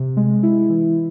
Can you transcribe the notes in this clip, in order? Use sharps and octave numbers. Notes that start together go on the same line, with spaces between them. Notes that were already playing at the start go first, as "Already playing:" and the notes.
Already playing: C3
G#3
E4
E3